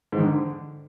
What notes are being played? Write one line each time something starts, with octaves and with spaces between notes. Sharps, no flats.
G#2
D#3
D3